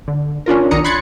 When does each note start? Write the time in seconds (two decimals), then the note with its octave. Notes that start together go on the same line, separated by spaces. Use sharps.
0.08 D3
0.46 C#4 D4 F4 A#4
0.71 B1 D#3 D4 A#5 D#6 C#7
0.84 B5 C6 F#6 G#6 A6 C#7